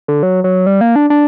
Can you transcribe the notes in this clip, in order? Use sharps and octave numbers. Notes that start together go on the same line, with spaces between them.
D3
F#3
F#3
G3
A#3
D4
D4